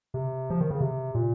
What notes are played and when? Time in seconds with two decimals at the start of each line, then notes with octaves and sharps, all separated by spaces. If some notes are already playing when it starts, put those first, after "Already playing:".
0.14 C3
0.50 F3
0.60 D#3
0.70 C#3
0.81 C3
1.15 A#2